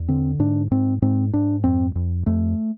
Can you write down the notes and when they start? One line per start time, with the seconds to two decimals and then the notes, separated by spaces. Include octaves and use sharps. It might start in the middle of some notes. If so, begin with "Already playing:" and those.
Already playing: E2
0.08 D3 C4
0.39 G#2 D4
0.71 G#2 C4
1.02 G#2 C4
1.33 G#2 D4
1.64 F2 C4
1.95 F2
2.26 F2 A3